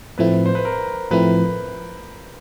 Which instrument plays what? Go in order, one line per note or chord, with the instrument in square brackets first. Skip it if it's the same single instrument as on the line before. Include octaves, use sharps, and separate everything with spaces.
[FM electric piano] A2 F3 A3 C4 E4 [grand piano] B4
[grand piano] C5
B4
A#4
[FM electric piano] A2 F3 A3 C4 E4 [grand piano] B4